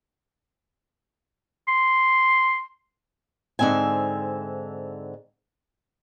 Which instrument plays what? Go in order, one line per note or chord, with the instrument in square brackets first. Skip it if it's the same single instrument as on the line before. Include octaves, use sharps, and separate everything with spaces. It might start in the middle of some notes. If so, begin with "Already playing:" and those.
[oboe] C6
[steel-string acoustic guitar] G#2 D3 C4 E5 G#5